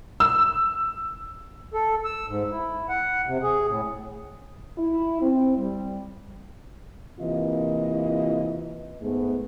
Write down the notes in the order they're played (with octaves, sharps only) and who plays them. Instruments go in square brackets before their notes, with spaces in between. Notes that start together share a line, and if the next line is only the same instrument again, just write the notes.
[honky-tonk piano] E6
[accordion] A4
E6
G#2
E4
F#5
C3
G#4
A2
[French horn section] E4
C4
G3
C3 E3 A#3 F4 D#5
G#2 G#3 A3 B3